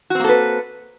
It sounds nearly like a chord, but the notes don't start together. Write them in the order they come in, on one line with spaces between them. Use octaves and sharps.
F#4 C4 A#3 A4 B4